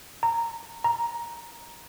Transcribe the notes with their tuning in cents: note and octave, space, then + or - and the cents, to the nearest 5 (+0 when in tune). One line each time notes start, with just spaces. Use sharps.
A#5 -15
A#5 +10